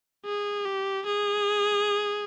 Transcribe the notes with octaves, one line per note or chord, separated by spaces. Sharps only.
G#4
G4
G#4